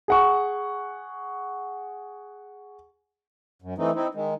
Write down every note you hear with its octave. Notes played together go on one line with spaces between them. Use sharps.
G#4 F#5 C#6
F#2
E3 A3 C4 D#4
C4 D#4 E4
D#3 G#3